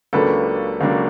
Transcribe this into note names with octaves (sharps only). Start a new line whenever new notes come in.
C#2 C#3 F#3 A#3 D4 A4 B4
C#2 C#3 F#3 A#3 D4